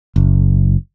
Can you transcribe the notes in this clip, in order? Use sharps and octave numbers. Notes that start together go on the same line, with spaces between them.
F#1